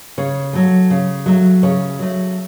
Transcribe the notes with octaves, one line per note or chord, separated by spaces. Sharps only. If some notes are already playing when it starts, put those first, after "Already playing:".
C#3 C#5
F#3 A3
C#3
F#3 A3
C#3 C#5
F#3 A3